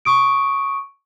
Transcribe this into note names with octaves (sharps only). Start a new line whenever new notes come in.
C#6 D#6 D7